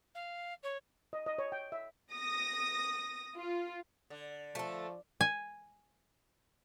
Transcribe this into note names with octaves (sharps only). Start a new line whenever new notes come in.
F5
C#5
D#5
D#5
C#5
G5
E5
D#6 A#6
F4
D3
F3 A3 A4
G#5